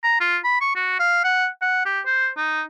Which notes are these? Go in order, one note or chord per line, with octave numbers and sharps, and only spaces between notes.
A#5
F4
B5
C#6
F#4
F5
F#5
F#5
G4
C5
D#4